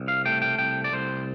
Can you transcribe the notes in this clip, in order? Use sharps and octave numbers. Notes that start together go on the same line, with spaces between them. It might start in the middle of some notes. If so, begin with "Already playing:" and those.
Already playing: C2
F5
A3 G5
G5
C2 G5
D5
C2 C5